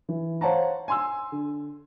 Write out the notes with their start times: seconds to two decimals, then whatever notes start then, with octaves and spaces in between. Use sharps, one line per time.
0.09 E3
0.41 C5 C#5 F5 F#5 A5 A#5
0.88 G#5 C6 E6
1.32 D3